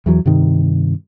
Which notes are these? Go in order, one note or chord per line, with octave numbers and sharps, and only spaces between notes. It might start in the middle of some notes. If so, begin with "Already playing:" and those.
E2 E3 F#3
G2 C3 D#3